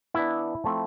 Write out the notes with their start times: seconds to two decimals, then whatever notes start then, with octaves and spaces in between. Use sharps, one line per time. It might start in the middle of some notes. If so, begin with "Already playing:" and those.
0.14 E3 B3 D4 E4
0.64 F3 A3 C4 E4